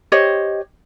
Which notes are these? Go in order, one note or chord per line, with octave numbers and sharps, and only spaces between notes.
G4 C5 C#5 D#5